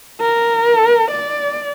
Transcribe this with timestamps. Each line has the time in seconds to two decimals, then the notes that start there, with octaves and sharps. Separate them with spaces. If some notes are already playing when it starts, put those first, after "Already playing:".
0.21 A#4
1.11 D5